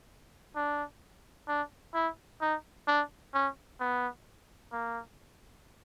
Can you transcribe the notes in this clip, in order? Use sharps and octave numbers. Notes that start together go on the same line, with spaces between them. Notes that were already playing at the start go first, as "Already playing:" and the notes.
D4
D4
E4
D#4
D4
C#4
B3
A#3